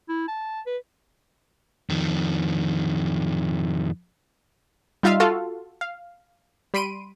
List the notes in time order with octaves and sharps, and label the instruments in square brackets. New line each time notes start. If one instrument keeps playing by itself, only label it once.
[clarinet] E4
A5
B4
[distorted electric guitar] F2 D#3
[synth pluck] G3 D#4 F4 E5 F5
F4 F#4 A4 F5
F5
G3 B5 C6 D7 D#7